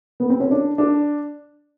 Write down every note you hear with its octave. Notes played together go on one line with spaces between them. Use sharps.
B3
C4
C#4
D4
D4